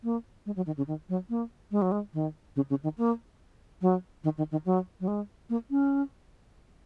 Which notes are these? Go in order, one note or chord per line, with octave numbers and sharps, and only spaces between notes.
A#3
G#3
F#3
D#3
C#3
D#3
F#3
A#3
G#3
F#3
G#3
D#3
C#3
C#3
D#3
A#3
F#3
D#3
D#3
D#3
F#3
F#3
G#3
A#3
C#4